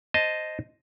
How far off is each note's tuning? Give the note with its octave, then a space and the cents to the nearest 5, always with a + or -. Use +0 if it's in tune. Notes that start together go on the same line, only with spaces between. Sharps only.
C5 +0 D#5 +0 A5 +0